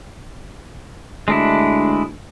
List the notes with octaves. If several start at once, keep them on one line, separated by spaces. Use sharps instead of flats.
D2 G#3 D4 E4